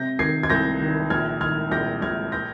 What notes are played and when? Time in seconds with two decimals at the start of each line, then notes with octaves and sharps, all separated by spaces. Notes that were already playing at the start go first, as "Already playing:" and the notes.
Already playing: C3 G6 A#6
0.19 D#3 G#6 C7
0.43 G#6
0.50 C2 G6 A#6
0.80 D#3
1.10 A#1 F6 G#6
1.41 D#3 F6 G#6
1.71 A#1 G6 A#6
2.02 A#1 F6 G#6
2.32 G6 A#6